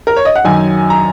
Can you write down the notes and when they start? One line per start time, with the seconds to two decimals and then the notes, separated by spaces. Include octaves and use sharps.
0.07 A#4
0.16 C#5
0.25 D#5
0.35 F#5
0.44 F#2 D#3 F#3 D#4 G#5
0.90 A#5